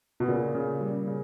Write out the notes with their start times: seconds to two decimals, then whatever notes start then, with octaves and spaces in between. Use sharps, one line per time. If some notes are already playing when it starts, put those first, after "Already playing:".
0.20 B2
0.28 A#2 C#3
0.55 C#3
0.81 G3
1.07 C#3